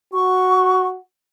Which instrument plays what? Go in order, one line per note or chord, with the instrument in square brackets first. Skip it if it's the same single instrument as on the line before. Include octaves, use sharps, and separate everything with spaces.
[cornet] F#4 [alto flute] C#6